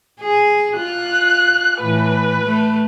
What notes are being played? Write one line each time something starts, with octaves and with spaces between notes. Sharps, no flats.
G#4
F4 F#6
A2 E3 B4
A3